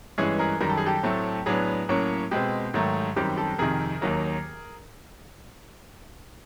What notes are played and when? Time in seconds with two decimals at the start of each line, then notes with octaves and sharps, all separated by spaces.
0.18 G2 E3 G#3 C#4 G#4
0.39 G#4 A#4
0.60 F#2 D#3 G3 A#4
0.69 A4
0.77 G#4
0.86 G4 A4
1.03 A2 F#3 A3 C4
1.46 A2 F#3 B3 D4 G#4
1.89 A2 F#3 A#3 C#4
2.31 B2 G#3 C4 G4
2.74 G#2 D#3 F#3 A3
3.16 F#2 D#3 G3 C4 G4
3.37 G4 A4
3.58 F2 C3 D#3 G#4 A#4
4.01 D#2 D#3 F#3 A#3